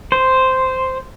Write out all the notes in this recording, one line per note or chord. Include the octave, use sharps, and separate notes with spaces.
C5